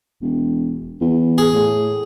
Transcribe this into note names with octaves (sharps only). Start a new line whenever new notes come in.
E1
E2
G#4
A2